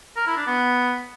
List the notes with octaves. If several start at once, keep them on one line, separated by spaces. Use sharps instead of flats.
A#4
E4
D4
B3